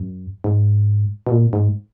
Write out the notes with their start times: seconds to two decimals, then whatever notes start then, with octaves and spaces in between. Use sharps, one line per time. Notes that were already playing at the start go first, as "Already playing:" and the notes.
Already playing: F#2
0.44 G#2
1.27 B2
1.31 A#2
1.53 G#2